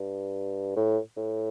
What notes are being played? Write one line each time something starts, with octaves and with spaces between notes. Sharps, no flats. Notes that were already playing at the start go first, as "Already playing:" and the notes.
Already playing: G2
A2
A2